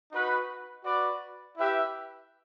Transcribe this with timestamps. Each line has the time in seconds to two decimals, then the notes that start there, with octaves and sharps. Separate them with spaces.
0.12 D#4 F#4 B4
0.85 F#4 B4 D5
1.58 E4 G4 B4 E5